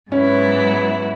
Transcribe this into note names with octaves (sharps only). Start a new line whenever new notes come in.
G#2 F#3 B3 C#4 E4